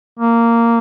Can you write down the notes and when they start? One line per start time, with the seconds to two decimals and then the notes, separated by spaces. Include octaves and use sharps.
0.19 A#3